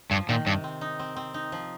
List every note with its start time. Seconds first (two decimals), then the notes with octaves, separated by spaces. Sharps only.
0.11 G2 F3
0.29 A#2 D#3
0.47 G2 C3
0.64 C4
0.81 D#4
0.99 C4
1.16 C4
1.34 D#4
1.52 F3